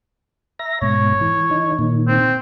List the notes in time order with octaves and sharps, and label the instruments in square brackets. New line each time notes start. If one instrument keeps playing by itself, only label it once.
[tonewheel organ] E5 A#5 A#6
[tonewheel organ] G#2 B2 [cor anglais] C#5
[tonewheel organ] E3
E3 D#4
A#2 D#3
[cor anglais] C4